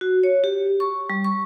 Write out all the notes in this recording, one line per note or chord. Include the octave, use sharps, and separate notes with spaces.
F#4
C#5
G4
C#6
G3
C#6